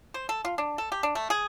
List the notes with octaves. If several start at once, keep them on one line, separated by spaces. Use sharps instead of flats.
C5
A4
F4
D4
A4
G4
D4
A3
G#4